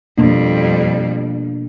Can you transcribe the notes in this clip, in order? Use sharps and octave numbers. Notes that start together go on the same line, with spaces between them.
F2 B2 G3 A#3 D4